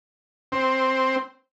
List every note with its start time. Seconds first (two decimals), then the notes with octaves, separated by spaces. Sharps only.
0.52 C4